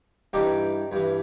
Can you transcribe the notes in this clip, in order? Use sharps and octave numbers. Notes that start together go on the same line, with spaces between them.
G2 E3 D#4 G4
G2 E3